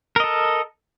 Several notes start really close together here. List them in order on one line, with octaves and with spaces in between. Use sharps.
A#4 D#5 A4